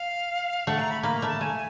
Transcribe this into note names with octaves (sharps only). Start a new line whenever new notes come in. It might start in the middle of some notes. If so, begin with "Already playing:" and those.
Already playing: F5
A3 F#5
A#5
B5
A#3 B5
A#5
A3
A5
A3 G#5